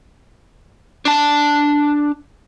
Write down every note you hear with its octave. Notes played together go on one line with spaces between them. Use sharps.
D4 A5